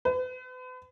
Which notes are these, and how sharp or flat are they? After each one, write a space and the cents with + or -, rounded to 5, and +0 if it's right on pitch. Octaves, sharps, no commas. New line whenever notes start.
B4 +40